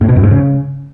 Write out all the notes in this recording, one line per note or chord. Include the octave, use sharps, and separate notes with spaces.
A2
B2
F#2
G#2
C#3